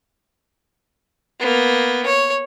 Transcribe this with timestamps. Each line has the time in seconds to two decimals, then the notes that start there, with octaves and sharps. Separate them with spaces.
1.40 A#3 B3
2.06 C#5